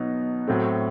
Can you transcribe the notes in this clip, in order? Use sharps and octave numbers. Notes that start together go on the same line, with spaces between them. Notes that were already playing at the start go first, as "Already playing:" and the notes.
Already playing: B2 F#3 B3 D#4
A2 F#3 A3 C4